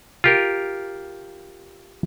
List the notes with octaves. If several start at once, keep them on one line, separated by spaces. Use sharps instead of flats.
F4 G4 A#4